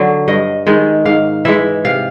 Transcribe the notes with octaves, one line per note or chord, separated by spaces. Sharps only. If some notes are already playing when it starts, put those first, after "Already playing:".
Already playing: D3 F#3
G2 D#5
D#3 G#3
G#2 F5
E3 G#3 E5
C3 F5